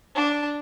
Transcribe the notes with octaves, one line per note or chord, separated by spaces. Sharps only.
D4